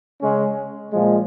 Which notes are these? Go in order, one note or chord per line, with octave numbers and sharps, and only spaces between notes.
C#3 G#3 C#4
A#2 F3 G#3